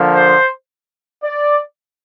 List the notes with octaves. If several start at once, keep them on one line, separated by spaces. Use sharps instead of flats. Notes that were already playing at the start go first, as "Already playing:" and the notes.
Already playing: D3 F3 A#3
C5
D5